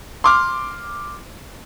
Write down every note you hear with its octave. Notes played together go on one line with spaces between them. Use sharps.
C6 D6 F6